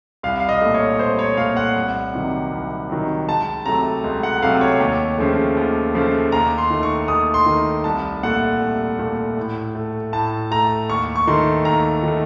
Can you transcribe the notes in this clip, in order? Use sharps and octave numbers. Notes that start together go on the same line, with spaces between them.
C2 F5
F5
D#5
A#2 A3
C#5
C2 C5
C#5
A#2 A3 F5
F#5
C2
C3 D#3 F#3
C2
C3 D#3 F#3
C#2 A5
C3 F#3 A3 A#5
C#2
F#5
C3 F#3 A3 F5
C#5
D#2
C#3 F3 A3
D#2
C#3 F3 A3
D#2 A#5
C6
D#3 A3
C#6
D#2 D#6
C6
D#3 A3
C2 A5
A#2 A3 F#5
C2
A#2 A3
A2
A3
A2 A5
A3 A#5
D#2 C#6
C#6
D#3 A3 C6
D#2 A#5
D#3 A3